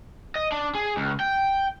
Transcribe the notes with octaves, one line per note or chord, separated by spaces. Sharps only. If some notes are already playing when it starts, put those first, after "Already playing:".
D#5
D4
G#4
C#2
G5